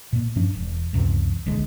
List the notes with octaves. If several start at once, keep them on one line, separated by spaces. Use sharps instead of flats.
A#2 A#3
G2 F3 C#4 D4
E1
C#2 F#2 C3 E3
D1 A#1 D3 G#3